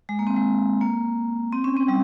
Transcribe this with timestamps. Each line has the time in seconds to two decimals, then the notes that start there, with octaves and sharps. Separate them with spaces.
0.09 G#3
0.19 A#3
0.27 C4
0.36 G#3
0.81 A#3
1.52 C4
1.64 C#4
1.77 C4
1.88 G3